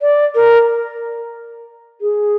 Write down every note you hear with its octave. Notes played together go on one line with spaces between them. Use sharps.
D5
A#4
G#4